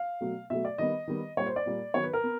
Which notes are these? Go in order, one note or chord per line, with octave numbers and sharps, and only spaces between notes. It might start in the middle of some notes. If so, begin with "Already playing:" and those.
Already playing: F5
B2 F#3 A3
B2 F#3 A3 E5
D5
D#3 G3 B3 D#5
D#3 G3 B3
A#2 G3 A#3 C#5
C5
D5
A#2 G3 A#3
D#3 F#3 B3 C#5
B4
A#4
B3